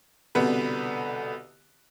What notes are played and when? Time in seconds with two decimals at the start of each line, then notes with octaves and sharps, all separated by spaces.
0.35 C2 B2 D3 B3 B4